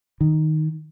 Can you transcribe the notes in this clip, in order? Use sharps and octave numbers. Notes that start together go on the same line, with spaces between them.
D#3